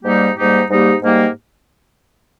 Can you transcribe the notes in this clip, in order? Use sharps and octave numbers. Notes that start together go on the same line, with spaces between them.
G#2 G3 A#3 D#4 G4
G#2 G3 A#3 D#4 G4
G#2 G3 A#3 D#4 G4
G#2 G3 A#3 D#4 G4